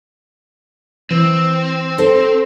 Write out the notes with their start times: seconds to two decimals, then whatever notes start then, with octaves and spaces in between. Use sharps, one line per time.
1.11 E3 C4
1.98 A4 C5